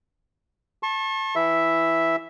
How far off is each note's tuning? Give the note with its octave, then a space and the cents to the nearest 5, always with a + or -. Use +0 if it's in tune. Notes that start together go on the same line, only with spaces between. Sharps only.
A5 +0 C#6 -45
E3 +0 E4 +0 E5 +0